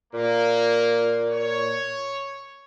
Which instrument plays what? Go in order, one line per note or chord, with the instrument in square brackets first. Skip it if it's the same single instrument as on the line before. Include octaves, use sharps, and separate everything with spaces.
[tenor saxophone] A#2 [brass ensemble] A#3
[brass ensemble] C#5